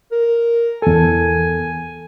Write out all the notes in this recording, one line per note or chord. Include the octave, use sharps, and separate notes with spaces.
A#4
E2 A4 G#5